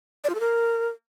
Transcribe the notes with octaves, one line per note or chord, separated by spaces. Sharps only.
D5
F4
A4
A#4